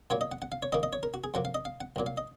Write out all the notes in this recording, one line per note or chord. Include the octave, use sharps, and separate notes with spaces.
A#2 F#3 A#3 C#5
D#5
F#5
F#5
F5
C#5
G#2 D#3 A#3 D#5
D#5
C#5
A#4
F#4
G#4
F2 C3 F#3 A#3 F#5
F5
D#5
F5
F#5
C2 A#2 F#3
F5
D#5